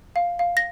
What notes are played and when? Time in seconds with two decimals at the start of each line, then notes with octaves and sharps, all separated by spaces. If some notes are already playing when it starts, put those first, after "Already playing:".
0.16 F5
0.39 F5
0.57 A#6